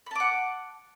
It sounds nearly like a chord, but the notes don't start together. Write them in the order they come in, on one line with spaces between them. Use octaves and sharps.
B5 A5 D6 F#5